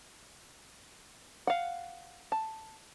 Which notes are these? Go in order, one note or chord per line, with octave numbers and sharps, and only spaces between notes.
F5 F#5
A5